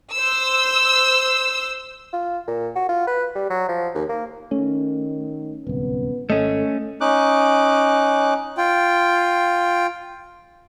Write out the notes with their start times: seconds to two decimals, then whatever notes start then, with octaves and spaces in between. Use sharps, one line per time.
0.13 C5 E6
2.13 F4
2.47 A#2
2.76 F#4
2.89 F4
3.07 B4
3.35 G3
3.50 F#3
3.69 F3
3.95 D#2
4.09 A#3
4.51 D#3 A3 C#4
5.67 D1 C2 B3
6.30 G#1 A3 C#4 A4 D#5
7.01 C#4 D#4 D6 F#6
8.57 F4 G5